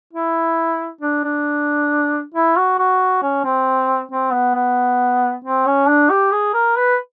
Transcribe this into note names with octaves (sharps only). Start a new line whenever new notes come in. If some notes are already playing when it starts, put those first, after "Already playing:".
E4
D4
D4
E4
F#4
F#4
C#4
C4
C4
B3
B3
C4
C#4
D4
G4
G#4
A#4
B4